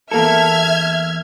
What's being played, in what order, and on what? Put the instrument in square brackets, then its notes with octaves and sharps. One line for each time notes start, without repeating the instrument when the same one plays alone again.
[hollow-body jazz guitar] E2 A#3 A4 [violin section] E5 F6 G#6